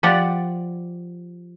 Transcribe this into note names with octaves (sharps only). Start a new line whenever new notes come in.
F3 G4 D5 F#5